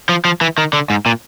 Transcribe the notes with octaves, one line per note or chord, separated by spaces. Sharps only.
F3
F3
E3
D#3
D3
G#2
A#2